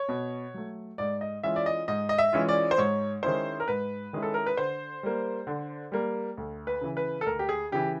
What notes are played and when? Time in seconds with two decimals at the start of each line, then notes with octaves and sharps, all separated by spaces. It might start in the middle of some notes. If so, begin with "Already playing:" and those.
Already playing: C#5
0.09 B2
0.54 F#3 A3
0.98 G#2 D5
1.21 D#5
1.43 E3 G#3 C#4 F4 E5
1.56 D5
1.66 D#5
1.88 G#2 D#5
2.09 D#5
2.18 E5
2.33 E3 G#3 C#4 F4
2.49 D5
2.71 C5
2.78 G#2 C#5
3.23 D#3 G#3 C#4 E4 C5
3.60 A#4
3.68 G#2 B4
4.13 D#3 G#3 C#4 E4
4.23 A4
4.34 A#4
4.46 B4
4.57 D3 C5
5.03 G3 A#3
5.47 D3
5.92 G3 A#3
6.37 D2
6.67 B4
6.81 C#3 E3
6.97 B4
7.21 A4
7.26 D2 A#4
7.39 G4
7.49 G#4
7.72 C#3 E3 G4